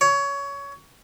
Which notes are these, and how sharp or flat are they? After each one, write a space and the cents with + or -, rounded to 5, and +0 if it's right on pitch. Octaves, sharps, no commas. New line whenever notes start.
C#5 +20